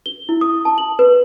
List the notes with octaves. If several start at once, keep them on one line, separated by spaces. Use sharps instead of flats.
G7
E4
D#6
A5
F#7
B4